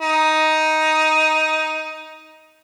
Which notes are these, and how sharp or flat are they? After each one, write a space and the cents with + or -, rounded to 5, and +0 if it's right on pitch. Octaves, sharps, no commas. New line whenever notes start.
D#4 +10